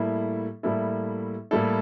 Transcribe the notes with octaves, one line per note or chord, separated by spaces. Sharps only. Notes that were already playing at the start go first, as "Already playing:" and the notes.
Already playing: A2 G3 A#3 E4 A4
A2 G3 A#3 E4 A4
A2 G3 A#3 E4 A4